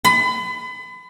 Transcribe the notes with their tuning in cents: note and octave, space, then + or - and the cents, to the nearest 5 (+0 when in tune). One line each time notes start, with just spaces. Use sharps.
B5 +35